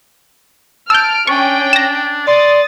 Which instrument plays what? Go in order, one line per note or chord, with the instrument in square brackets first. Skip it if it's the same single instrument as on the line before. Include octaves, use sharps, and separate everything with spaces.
[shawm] A5 [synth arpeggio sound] E6 G6 [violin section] F6 D7
[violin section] C#4 G5 [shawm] D4 [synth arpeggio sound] C#6
[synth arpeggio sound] A#6 E7
[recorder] D5 [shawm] C6 [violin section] D#6 A6